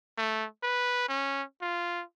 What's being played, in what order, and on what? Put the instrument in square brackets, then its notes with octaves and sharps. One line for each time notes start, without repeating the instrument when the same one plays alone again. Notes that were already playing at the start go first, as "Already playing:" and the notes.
[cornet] A3
B4
C#4
F4